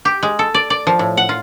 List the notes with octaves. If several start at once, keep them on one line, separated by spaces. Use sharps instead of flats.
G4
G#3
A4
D5
D5
F3
A2
F#5
F4